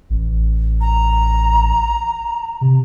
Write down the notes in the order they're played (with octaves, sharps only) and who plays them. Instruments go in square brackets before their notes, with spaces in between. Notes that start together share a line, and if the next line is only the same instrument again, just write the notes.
[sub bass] A1
[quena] A#5
[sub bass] C3